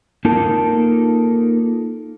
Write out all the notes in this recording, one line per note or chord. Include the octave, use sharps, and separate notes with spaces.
A#3 D#4 F4 A4 A#4 A5